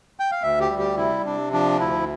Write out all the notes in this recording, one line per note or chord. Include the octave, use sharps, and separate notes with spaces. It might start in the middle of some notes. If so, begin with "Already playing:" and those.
G5
F5
D2 E5
G4
G3
G4
C3 E4
C3 D4
F3 D4
D2 E4